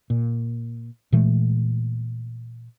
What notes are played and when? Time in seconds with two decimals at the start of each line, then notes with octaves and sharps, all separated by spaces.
0.10 A#2
1.12 A#2 E3 G#3 A3